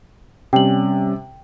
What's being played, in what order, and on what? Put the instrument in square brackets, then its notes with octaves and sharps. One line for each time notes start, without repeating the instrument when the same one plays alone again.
[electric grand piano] C3 [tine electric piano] G3 C#4 [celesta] G5 F#7